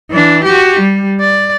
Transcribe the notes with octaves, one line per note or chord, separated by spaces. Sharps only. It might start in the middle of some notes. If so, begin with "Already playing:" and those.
E3 D4
F#4 G4
G3
D5